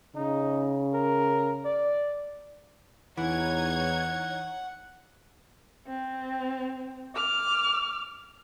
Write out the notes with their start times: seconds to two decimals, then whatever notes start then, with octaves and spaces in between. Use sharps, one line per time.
0.16 C#3 D#4
0.94 A#4
1.65 D5
3.17 E2 E3 D#4 C#5 F#5 G#6
5.88 C4
7.15 D6 F6